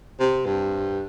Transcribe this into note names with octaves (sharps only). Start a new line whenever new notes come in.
C3
G2